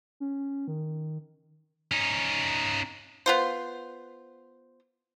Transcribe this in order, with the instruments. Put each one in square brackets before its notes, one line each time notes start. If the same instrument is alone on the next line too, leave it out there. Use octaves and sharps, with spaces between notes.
[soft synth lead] C#4
D#3
[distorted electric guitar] C#4 D#4
[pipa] B3 F4 C5